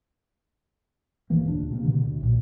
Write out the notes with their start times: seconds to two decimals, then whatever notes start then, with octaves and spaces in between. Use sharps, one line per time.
1.30 G1 D#3 E3 A#3
1.45 D#1 D2 D4
1.70 C3 A#3
1.84 B2 D3 D#3
2.04 D2
2.21 B1 A#2